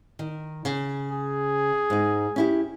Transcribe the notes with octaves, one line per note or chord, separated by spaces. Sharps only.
D#3
C#3
G#4
G#2 D#4
C#4 E4 G4